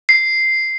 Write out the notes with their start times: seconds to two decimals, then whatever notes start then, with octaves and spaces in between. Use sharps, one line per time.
0.09 C7